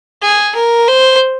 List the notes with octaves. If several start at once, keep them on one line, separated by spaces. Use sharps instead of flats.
G#4
A#4
C5